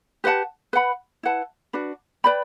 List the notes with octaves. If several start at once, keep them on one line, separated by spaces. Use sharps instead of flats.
G4 B4 F#5 A5
B4 F#5 B5
E4 B4 F#5 A5
D4 F#4 B4
B4 D5 G5 B5